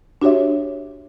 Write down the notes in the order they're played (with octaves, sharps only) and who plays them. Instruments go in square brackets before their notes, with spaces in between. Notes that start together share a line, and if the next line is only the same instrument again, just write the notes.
[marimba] D4 F#4 G4 C#5 E5